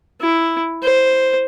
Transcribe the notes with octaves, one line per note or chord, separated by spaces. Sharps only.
E4
C5